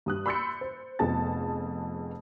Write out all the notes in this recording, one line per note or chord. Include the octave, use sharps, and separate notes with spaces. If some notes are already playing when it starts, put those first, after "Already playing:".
G2 D#6 F#6
B5 C6 E6 G6 A6 C#7
C5
F1 F2 B3 G#4 A5 A6